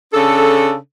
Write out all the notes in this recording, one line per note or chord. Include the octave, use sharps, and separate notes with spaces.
C#3 D4 A4